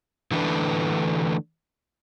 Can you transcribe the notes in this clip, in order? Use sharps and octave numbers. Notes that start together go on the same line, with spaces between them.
D3 E3 A3 D4 B4